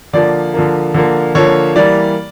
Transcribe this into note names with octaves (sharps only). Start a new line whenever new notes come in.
D3 F3 A#3 D5
D3 F3 A#3
D3 F3 A#3
D3 F3 A#3 C#5
E3 G3 A#3 D5